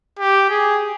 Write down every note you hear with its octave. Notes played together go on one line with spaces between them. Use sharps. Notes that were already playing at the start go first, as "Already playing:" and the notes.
G4
G#4